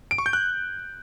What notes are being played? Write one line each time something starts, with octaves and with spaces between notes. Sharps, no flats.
D7
C#6
G6
F#6